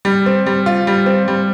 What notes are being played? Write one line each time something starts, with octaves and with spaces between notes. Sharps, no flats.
G3
C4
G3
F4
G3
C4
G3